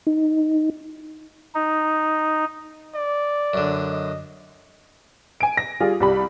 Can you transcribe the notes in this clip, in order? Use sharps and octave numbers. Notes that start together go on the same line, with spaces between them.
D#4
D#4
D5
F#2 D3
D#5
G#5 D7
A#6
G3 F4 G#4
C2 G3 B5